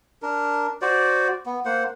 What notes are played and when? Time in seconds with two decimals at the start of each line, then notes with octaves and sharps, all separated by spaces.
0.22 D4 A#4
0.82 F#4 C5 D5
1.46 B3
1.65 A#3 C5 F#5